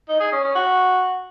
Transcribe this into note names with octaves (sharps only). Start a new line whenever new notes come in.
D#4
G#4
C#4
C#4
F#4